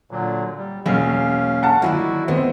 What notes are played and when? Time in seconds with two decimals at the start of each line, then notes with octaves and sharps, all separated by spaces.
0.11 A#2 D3 F#3
0.57 G3
0.86 E1 F#3 A#3 C#4 F5 A#5
1.63 F#5 A5
1.82 D3 D#3 F#3 D4 E4 F#4
2.28 D#3 B3 C4